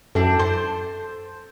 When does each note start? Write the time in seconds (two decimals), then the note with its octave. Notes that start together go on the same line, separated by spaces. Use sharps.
0.15 F#2 C4 D4 E4 A4
0.39 C5 A5